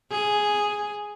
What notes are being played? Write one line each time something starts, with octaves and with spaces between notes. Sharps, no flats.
G#4